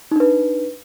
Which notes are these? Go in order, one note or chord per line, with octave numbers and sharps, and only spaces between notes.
D4 D#4 B4